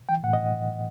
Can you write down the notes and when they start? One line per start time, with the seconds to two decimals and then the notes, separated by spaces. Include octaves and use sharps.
0.09 E3 G5
0.23 A2 F#5
0.33 D#5